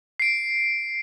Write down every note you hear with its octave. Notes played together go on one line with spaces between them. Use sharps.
C7 D7